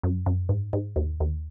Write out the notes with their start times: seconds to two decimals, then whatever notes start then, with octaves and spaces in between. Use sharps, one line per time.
0.03 F#2
0.26 F#2
0.49 G#2
0.73 G#2
0.96 D#2
1.20 D#2